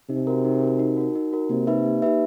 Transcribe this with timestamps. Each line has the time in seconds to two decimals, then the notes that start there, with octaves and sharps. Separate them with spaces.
0.10 C3 D#4
0.27 F#4 A#4
0.45 D#4
0.62 F#4 A#4
0.79 D#4
0.97 F#4 A#4
1.15 D#4
1.33 F#4 A#4
1.50 C3 A#3
1.67 D#4 G4 B4 E5
1.85 A#3
2.02 D#4 G4 B4 E5